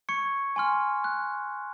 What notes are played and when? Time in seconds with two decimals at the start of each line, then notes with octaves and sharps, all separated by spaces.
0.09 C#6 G#6 C#7
0.56 G#5 C6 F6
1.04 F#6